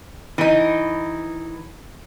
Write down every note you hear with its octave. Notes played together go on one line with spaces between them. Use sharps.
E3 D#4